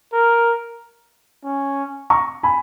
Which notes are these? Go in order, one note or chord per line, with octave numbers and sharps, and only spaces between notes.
A#4
C#4
A#5 C#6
G#5 B5